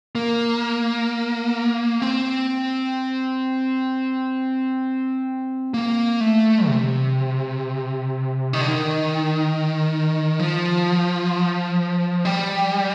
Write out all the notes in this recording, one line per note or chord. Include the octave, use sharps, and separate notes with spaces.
A#3
C4
A#3
A3
C3
D#3
D3
D#3
F3
G3